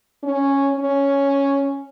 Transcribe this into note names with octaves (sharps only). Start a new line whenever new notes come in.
C#4
C#4